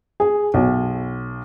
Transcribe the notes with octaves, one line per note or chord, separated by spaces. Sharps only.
G#4
B1